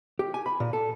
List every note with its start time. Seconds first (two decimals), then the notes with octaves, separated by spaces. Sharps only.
0.19 G4
0.34 G#5
0.46 B5
0.60 A#2
0.73 A4